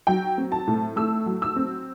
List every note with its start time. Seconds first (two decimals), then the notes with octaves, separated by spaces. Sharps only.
0.07 F#3 G5
0.38 C4
0.52 A5
0.67 A2
0.96 A3 E6
1.26 F#3
1.42 E6
1.56 C4